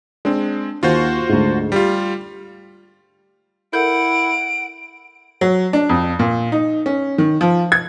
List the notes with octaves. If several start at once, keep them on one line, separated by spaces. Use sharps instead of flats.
G#3 C4 D4
D#2 F4 F#4 C5
D2 G#2
G3 F4 G4
E4 A4 A#4 F#5 G6 D7
F#3
D4
F2
A#2
D#4
C#4
D#3
F3
G#6